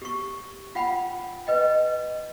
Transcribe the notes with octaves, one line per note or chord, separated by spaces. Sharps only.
G4 C#6
F4 F#5 G5 B5
B4 D#5 G5